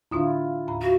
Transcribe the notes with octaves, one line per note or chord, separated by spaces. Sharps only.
A2 D3 D4 E4 F4
D#2 A2 B5
F#4 F5